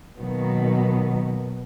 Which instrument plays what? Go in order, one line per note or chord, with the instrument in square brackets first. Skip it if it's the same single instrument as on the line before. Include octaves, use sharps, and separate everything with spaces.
[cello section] B2 D#3 F#3 A#3 B3